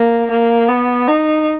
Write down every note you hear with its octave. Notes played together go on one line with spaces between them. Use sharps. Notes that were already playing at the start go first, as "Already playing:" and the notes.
Already playing: A#3
A#3
B3
D#4